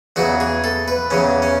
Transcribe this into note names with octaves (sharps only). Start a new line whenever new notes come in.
E2 C#3 F#3 F#4
G#4
A4
B4
E2 C#3 F#3 C#4
C#4